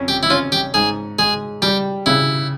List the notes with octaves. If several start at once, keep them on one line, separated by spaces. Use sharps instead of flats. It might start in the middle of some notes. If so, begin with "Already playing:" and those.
Already playing: F2 C#4
G4
E4
C#4 F4
G4
G#2 G#4
G#3 G#4
G3 G4
C#3 E4